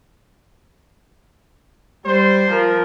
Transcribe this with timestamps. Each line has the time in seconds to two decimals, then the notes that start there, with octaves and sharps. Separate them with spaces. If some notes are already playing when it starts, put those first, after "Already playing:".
2.06 G3 C5
2.49 F3 A#4